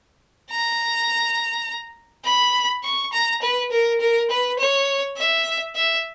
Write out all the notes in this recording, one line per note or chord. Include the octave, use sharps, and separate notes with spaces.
A#5
B5
C#6
A#5
B4
A#4
A#4
B4
C#5
E5
E5